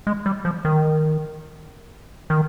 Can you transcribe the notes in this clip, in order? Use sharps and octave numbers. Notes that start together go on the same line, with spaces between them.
G#3
G3
F3
D#3
D#3